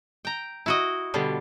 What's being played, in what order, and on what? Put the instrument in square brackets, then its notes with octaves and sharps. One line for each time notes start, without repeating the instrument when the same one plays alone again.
[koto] G5 A#5
E4 F#4 D#5
B2 D3 G3